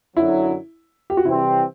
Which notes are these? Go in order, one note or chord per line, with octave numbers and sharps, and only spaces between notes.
F#2 D3 F#3 E4
G4
F#4
C3 E3 G3 C4 E4